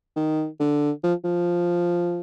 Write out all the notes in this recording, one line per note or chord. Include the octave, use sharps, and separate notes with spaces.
D#3
D3
F3
F3